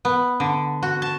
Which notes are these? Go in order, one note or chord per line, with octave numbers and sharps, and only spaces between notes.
B3
D3
F#4
A5